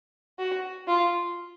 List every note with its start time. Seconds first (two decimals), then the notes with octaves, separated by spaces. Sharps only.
0.39 F#4
0.87 F4